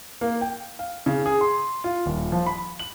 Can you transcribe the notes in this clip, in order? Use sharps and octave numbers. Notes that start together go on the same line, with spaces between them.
A#3
G5
F5
C#3
G#4
C6
F4
D#1
F3
B5
F#7